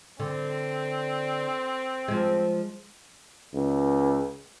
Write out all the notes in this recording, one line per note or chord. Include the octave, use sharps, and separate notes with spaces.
D3 C4
F3 G#3
C#2